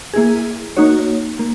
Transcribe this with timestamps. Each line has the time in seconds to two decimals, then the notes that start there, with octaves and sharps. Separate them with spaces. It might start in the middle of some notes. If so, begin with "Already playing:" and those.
0.14 A#3 E4 G#4
0.77 A#3 D#4 F#4 C#5
1.39 A#3